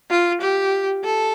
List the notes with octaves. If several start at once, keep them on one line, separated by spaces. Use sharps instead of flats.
F4
G4
A4